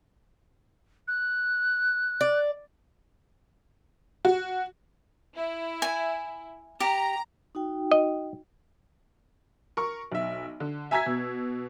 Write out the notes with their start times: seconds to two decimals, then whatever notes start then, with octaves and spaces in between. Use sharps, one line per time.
1.08 F#6
2.21 D5
4.25 F#4
5.37 E4
5.82 G#5
6.80 G4 A#5
7.55 D#4 F#4 G5
7.92 D#5
9.77 A#4 C#6
10.12 B1 E5
10.60 D3
10.91 E5 G#5 A#5 E6 G#6 B6
11.06 B2